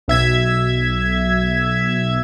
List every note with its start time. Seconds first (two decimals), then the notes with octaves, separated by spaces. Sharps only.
0.08 B1 E5 G#6